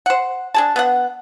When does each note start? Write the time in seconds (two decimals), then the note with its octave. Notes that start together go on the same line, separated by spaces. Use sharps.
0.06 C5 F#5
0.54 D4 G#4 A5
0.76 B3 D4 F#5